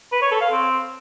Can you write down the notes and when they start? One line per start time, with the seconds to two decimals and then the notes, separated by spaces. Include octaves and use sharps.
0.12 B4
0.22 C#5
0.31 A4
0.41 F5
0.51 C4